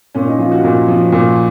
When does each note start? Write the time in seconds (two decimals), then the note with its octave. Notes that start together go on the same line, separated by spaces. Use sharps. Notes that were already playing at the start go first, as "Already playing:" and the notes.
0.15 A#2 C#4
0.27 D#4
0.39 F3 F4
0.51 F#4
0.64 A#2
0.88 F3
1.12 A#2